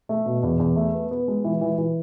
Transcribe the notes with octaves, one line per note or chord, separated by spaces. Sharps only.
A3
B2
E2
E2
A3
B3
B3
G#3
E3
E3
E3